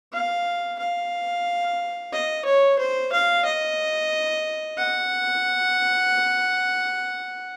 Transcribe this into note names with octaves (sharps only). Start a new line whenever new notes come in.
F5
F5
D#5
C#5
C5
F5
D#5
F#5